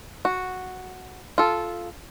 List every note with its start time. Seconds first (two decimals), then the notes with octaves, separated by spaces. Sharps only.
0.25 F#4
1.38 F4 A4